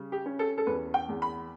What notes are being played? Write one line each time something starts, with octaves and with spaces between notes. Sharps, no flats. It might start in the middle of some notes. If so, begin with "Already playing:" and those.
Already playing: C#3 G3
G4
C#4
A4
A4
E2 B4
G5
E2
B5